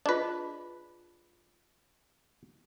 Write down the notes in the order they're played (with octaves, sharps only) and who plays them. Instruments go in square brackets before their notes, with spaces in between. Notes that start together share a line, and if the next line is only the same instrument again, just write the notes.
[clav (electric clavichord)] D4 B4 [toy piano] F4 G#4 D#5